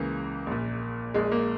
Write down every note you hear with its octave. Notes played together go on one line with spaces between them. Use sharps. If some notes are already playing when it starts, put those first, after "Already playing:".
Already playing: C#2 C#3 E3 A#3
A#1 A#2
A#1 A#2 G#3
A#3